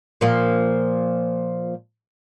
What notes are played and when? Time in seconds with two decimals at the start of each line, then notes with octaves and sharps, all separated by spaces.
0.21 A#2 F3 A#3